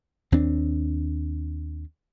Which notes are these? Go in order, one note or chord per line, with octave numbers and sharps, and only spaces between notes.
D#2 C4 D4